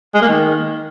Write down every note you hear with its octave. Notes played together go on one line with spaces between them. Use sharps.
G#3
A#3
D#3